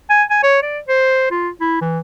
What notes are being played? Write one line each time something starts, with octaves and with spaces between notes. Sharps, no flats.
G#5
G#5
C#5
D5
C5
F4
E4
E3